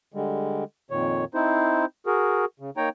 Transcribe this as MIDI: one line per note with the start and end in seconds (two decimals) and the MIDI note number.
0.14 0.64 50
0.14 0.64 55
0.14 0.64 56
0.91 1.25 41
0.91 1.25 46
0.91 1.25 51
0.91 1.25 73
1.34 1.85 60
1.34 1.85 63
1.34 1.85 64
1.34 1.85 72
2.06 2.45 66
2.06 2.45 68
2.06 2.45 70
2.60 2.70 49
2.77 2.89 58
2.77 2.89 63
2.77 2.89 73
2.77 2.89 79
2.77 2.89 82